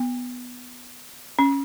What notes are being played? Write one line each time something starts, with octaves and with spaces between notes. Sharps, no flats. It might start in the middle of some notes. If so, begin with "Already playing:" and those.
Already playing: B3
C#4